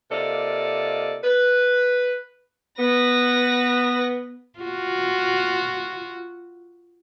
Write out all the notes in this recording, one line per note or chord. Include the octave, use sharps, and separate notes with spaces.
C3 A#3 F4 A4 D5 D#5
B4
B3 B4 A#6
F4 F#4